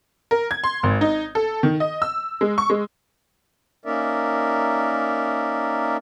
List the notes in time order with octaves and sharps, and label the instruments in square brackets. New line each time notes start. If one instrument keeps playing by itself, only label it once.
[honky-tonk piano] A#4
G#6
C6
G#1
D#4
A4
D#3
D#5
E6
G#3
C#6
G#3
[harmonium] A#3 C#4 D#4 A#4 D5 E5